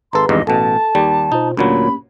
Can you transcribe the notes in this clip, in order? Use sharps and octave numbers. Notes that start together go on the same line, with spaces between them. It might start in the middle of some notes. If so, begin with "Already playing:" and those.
G#1 G#4 A4 B4 A#5 C6
G#1 E2 G2 D#5
A1 B2 A4 A5
D#2 G3
B2 D#4 F4 C5
D2 A#2 F#3 A#3 C#4 G4 B5